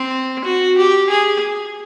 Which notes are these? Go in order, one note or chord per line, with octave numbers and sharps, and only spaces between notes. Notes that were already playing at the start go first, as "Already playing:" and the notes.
Already playing: C4
F#4
G4
G#4